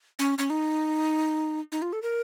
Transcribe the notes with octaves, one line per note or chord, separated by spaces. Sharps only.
C#4
C#4
D#4
D#4
F4
A4
A#4